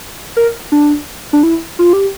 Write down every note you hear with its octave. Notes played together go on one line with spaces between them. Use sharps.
A#4
D4
D4
E4
F4
G4